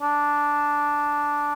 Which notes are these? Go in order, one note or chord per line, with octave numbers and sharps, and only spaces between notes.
D4